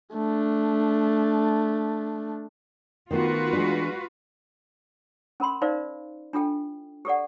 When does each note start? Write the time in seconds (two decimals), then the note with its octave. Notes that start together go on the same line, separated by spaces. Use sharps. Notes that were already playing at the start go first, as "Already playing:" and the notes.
0.14 A3 D4
3.11 D#3 A3 B3 F4 F#4 B4
3.53 E3 G#3 D4
5.40 C#4 A#4 B5 C6
5.62 D#4 A#4 C5 D5 F5
6.33 D4 F4 A4 G5
7.05 G4 A4 D5 F#5